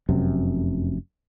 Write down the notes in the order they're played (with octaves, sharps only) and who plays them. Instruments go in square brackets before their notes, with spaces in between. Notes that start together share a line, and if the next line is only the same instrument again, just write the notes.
[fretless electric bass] F1 F#2 C3